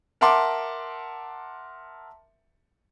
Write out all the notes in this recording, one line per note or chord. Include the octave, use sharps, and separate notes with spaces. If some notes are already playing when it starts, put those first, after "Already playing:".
A#4 E5 F#5 A5 C6 D6